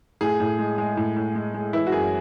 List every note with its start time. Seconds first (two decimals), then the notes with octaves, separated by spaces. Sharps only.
0.21 A2 G#4
0.40 A2
0.59 G#3
0.78 G#3
0.97 A2
1.16 A2
1.35 G#3
1.54 G#3
1.73 E3 E4
1.87 F#4
1.92 F#2 G#4